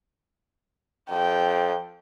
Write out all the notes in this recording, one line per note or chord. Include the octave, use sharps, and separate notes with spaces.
F2 G5